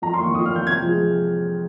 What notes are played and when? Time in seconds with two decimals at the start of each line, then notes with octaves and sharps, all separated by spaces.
0.02 F2 A#5
0.14 C6
0.19 D#3 A#3 C#6
0.34 F2 D#6
0.45 F6
0.50 D#3 A#3
0.56 G6
0.67 C3 G#6
0.82 F3 G#3
0.98 C3